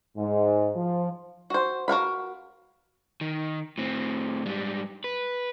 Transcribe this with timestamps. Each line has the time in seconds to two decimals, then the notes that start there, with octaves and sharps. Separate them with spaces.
0.17 G#2
0.75 F3
1.50 F#4 C5
1.88 F#4 A#4 F5 B5
3.21 D#3
3.78 A2 C4
4.46 G#2 G3
5.04 B4